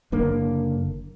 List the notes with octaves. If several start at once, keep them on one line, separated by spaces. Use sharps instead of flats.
F#1 D3 A#3